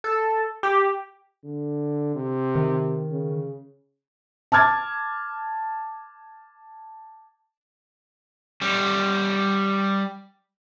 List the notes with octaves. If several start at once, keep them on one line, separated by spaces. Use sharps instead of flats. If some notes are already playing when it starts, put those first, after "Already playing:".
A4
G4
D3
C3
D#3
C#3
A5 D6 F6 G#6 A6
G3 C#4